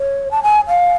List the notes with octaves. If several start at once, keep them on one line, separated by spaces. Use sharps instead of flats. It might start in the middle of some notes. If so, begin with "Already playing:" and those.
Already playing: C#5
A5
G#5
F5